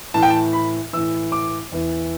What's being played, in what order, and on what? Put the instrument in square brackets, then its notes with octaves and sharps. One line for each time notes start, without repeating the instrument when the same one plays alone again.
[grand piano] A2 E3 A5
G5
A5
B5
A2 E3 E6
D6
E2 E3